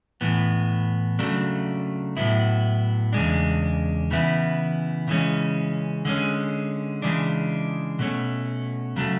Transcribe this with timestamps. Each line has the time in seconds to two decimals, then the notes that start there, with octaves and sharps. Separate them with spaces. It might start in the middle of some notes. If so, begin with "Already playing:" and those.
0.21 A2 E3 B3
1.19 C#3 F#3 A3 D4
2.17 A2 F#3 B3 E4
3.13 E2 C#3 G#3 D4
4.11 C#3 E3 B3 E4
5.08 C#3 E3 G#3 C#4
6.05 D3 G#3 C#4
7.02 C#3 E3 G#3 D4
7.99 B2 A3 C#4
8.96 C#3 F#3 A3